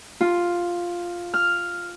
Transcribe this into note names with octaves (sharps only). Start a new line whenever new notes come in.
F4
F6